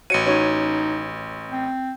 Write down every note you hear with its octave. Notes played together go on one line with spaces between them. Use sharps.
A1 F#4 C#5 C#7 D#7
C#4 D#4 F#4 C#5
C4